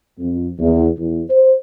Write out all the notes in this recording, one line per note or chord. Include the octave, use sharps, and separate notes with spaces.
F2
E2
E2
C5